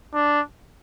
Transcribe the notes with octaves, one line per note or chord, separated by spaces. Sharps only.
D4